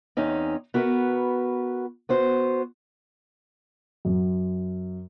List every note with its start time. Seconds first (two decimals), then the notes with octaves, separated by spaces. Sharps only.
0.17 E2 C4 C#4 D#4
0.74 B3 F#4 A#4 B4
2.09 B3 F#4 C5
4.05 F#2